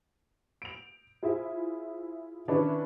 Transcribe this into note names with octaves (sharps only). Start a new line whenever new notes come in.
D7 F7
E4 F4 G#4 C5 E5
D#3 C#4 D4 E4 B4